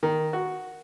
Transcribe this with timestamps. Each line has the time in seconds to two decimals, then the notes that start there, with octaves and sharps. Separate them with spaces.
0.03 D#3
0.33 F#4